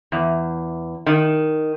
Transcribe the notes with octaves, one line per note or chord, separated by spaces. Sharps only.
E2
D#3